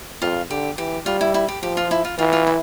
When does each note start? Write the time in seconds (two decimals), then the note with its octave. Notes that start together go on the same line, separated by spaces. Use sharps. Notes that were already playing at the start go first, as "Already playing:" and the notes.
0.22 F2 F4
0.50 D3 G4
0.78 E3 G4
1.06 G3 F4
1.21 E4
1.34 E4
1.48 G4
1.63 F3 G4
1.77 F4
1.91 E4
2.05 F4
2.18 E3 F4
2.33 F4
2.47 E4